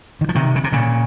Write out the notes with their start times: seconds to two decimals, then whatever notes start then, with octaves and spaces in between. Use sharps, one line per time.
0.21 D#3
0.29 F3
0.35 C3 D#3
0.55 C#3
0.64 C3
0.72 A#2 C#3